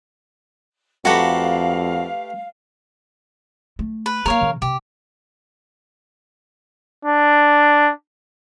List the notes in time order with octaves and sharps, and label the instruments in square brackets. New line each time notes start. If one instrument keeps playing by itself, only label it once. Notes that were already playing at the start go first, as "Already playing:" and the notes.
[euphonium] F2 [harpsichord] A3 G4 B4 [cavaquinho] F#4 A4 A#5 [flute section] F5
[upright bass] A3
[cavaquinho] B4
[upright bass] A#3 D#4 [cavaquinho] A#4 C#5 F5
[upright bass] C#3 E3
[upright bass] C3 [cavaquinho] G4
[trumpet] D4